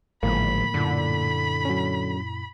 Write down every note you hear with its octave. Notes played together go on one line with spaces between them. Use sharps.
G#1 A2 D3 F3 G#3 A#3 B5
F#2 A#2 D3 E4
F#3 C#4